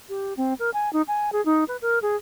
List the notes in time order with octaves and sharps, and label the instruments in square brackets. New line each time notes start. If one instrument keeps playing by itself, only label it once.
[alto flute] G4
C4
A#4
G#5
D#4
G#5
G#4
D#4
B4
A#4
G#4